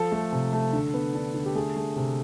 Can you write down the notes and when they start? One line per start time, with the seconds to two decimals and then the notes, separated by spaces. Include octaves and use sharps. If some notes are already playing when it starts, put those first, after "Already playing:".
Already playing: F3 A4
0.12 A3
0.32 C3
0.53 A3
0.73 D3
0.94 B3
1.14 D4
1.34 D3
1.46 G4
1.55 A3 G#4
1.76 A3
1.96 C3